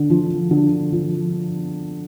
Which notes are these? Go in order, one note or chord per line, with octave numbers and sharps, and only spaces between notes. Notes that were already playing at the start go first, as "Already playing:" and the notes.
Already playing: D3
F3
D3
F3